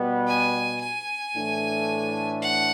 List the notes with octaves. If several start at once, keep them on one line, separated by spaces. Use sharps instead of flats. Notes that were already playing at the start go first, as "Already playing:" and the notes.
Already playing: B2 G3 B3
G#5
G#5
A2 E3 A3 D4
F#5